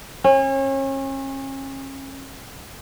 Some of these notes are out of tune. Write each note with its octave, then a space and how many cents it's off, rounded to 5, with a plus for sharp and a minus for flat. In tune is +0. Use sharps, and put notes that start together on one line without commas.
C#4 -35